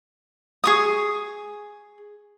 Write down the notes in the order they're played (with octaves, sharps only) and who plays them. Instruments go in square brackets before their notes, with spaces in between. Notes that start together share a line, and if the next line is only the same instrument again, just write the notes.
[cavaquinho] G#4 C#6 D#6